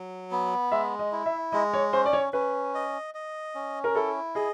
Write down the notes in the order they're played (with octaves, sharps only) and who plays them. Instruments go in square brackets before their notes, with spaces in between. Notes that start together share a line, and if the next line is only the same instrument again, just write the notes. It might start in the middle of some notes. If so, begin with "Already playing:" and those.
Already playing: [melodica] F#3
B3
[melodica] G#3 [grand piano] E5
[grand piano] D#5
[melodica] E4
[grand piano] E5
[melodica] G#3 [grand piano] D#5
[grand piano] C#5
[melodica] C#4 [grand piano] C5
[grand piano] D5
C#5
[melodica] C#4 [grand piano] B4
[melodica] D#5
D#5
C#4
[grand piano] A#4
[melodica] E4 [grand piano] A4
[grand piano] G#4 [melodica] D#5